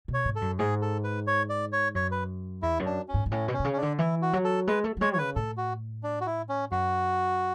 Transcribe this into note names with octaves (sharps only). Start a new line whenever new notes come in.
B2
C#5
G#2
A4
F#2
G#2 G#4
A4
B4
C#5
D5
C#5
F#2 C#5
B4
E2 E4
F#2
D4
C#4
G#2
G#2
A2 C#4
B2
C#4
B2
C#3
C#4
D4
D3
E3 E4
F#4
F#3
A4
G#3 B4
A3
F#3
G#3 C#5
C#5
C#3 B4
A2 A4
F#4
D4
F#4
E4
C#4
F#2 F#4